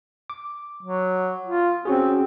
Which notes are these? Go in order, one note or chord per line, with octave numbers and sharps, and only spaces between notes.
D6
F#3
F4
C4 C#4 F#4 G#4